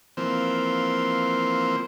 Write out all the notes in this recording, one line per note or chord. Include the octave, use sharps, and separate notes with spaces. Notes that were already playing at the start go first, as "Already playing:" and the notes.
E3 F3 A#3 C4 C5